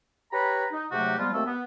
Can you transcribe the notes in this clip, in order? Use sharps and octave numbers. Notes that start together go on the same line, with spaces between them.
G4 B4 C#5 A#5 B5
D#4
G#2 C3 F#3 A3 F#4 G4
F3 G3 G#3 B3 F4
D#2 A3 A#3 C4 A4 E6
B3